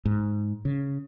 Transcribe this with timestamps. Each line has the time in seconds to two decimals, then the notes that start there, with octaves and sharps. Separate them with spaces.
0.05 G#2
0.65 C#3